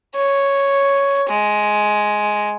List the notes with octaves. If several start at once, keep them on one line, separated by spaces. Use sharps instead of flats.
C#5
G#3